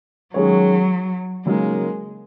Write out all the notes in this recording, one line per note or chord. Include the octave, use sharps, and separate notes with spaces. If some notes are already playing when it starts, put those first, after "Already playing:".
D#3 F#3 G#3 C#4 G#4 C#5
C#3 F#3 G#3 A#3 D#4 A#4